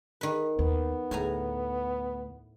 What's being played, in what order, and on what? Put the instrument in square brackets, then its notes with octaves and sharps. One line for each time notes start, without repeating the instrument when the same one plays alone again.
[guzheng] D#3 B4
[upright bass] D#2 [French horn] B3
[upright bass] D2 [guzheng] A2 G#5 A#5